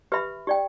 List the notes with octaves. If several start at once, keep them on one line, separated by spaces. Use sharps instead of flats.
G4 B4 E5 B5
G4 D5 G5